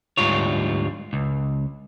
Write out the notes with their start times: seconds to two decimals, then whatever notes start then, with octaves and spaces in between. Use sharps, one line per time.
0.17 D2 G#2 G3 F4 C#5
1.13 C#2